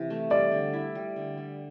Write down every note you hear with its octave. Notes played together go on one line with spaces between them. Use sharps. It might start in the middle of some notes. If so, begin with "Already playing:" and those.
Already playing: C3 E3
A3
G3 D5
D3
E4
G3
D3
G3